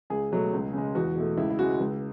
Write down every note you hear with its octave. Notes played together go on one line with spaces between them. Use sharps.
C#2 G#4
B2 F#3 A3
C#2
C#3 G#3
E2 F#4
B2 A3
C#2 E4
E4
C#3 G#3 F#4
C#2